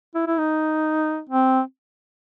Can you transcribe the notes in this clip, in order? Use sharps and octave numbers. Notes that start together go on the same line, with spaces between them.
E4
E4
D#4
C4